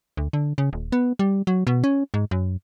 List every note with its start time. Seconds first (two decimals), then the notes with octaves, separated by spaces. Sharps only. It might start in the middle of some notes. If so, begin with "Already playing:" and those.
0.17 D2
0.33 D3
0.58 C#3
0.73 D#1
0.92 B3
1.19 G3
1.47 F#3
1.67 B2
1.84 C#4
2.14 G#2
2.31 F#2